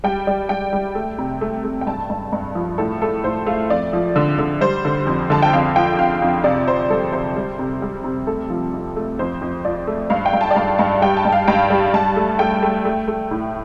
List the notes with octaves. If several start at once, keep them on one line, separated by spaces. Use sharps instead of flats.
G3 G5
G3 D5
G3 G5
G3
A3
C3
A3
A3
G5
G2 A5
G2
G2
F3
A2 A4
A3 A4
A2 C5
A3 F5
F2 D5
F3
D3
D3
G3 C5
D3
F2
D3 A5
G5
F2 F5
F3 G5
F2 F5
F2
C3 D5
C3 C5
G3 A4
C3 C5
G3
C3
G3
C3
A3 A4
F3
F2
A3
F2 C5
F2
F3 D5
A3
G2 F5
G5
G2
A5
D5
G2 F5
G2 A5
G3 G5
A5
G2
F5
G2 G5
G3
G2 A5
A3
A3 G5
A3
A3
A3
A2